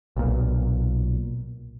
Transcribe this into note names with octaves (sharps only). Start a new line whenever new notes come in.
B1 A#2